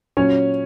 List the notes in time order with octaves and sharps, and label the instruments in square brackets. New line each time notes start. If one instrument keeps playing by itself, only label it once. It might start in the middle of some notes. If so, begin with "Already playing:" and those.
[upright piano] A#2 F#3 C#4 C#5